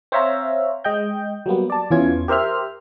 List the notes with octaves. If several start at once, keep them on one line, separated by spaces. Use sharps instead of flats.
C4 C5 C#5 E5 F5 A#5
G#3 D#5 G5 G6
F#3 G3 A#3 B3
D5 A5
E2 E3 C#4 F4 G#6
G4 A#4 C5 E5 F6